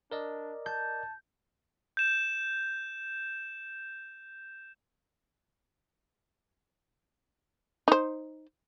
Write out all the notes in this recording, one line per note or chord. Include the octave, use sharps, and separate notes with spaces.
D4 A#4 D5 D#5
A5 G6
G6 E7
D#4 C5